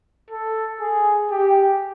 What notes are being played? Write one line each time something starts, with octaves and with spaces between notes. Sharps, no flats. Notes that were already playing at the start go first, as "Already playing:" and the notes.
A4
G#4
G4